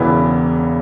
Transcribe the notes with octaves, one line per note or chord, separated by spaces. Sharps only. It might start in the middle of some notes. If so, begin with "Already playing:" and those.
Already playing: E1 E2 C#3 E3 B3